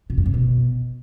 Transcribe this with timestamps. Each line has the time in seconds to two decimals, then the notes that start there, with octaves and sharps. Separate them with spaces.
0.10 B2
0.18 G2
0.26 C3
0.34 B2